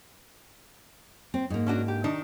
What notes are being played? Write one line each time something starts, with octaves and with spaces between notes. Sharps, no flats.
C4
G#2 A#3
C#4 D4 F#4
G4
D#3 D4 D#4